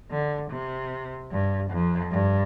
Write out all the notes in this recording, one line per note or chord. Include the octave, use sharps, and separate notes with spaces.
D3
C3
G2
F2
G2